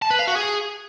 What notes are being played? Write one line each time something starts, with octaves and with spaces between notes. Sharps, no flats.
A5
B4
F5
F#4
G#4